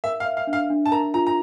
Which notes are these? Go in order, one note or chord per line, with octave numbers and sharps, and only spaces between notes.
A#4 E5
F5
E5
F5
D4
F5
D4
A5
A#4 A#5
F4 A#5
A#5